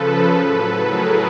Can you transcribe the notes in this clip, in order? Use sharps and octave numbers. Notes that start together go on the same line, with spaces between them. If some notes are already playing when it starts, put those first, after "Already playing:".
Already playing: C#3 F3 A4 B4
A2 F#3 A4 B4
G#4 A#4